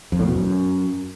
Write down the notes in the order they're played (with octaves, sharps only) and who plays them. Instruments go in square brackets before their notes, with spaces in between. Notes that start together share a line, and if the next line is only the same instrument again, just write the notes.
[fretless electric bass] F2
A2
B2
F#2